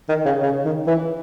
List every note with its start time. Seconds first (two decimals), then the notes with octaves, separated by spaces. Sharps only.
0.09 D#3
0.25 C#3
0.42 C#3
0.65 D#3
0.87 E3